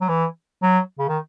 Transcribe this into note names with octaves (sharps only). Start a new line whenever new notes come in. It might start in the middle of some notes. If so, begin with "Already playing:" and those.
F#3
E3
F#3
C#3
D#3